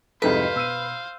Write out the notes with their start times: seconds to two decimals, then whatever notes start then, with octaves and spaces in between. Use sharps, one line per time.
0.22 C2 F2 G#2 A4 B4 C5 F5
0.56 B2 E6 D#7